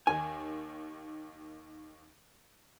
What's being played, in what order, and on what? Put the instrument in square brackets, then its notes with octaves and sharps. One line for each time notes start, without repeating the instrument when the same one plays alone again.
[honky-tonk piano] D#2 D#3 [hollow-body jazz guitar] G#5